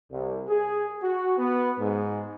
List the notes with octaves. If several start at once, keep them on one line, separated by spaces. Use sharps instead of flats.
C2
G#4
F#4
B3
G#2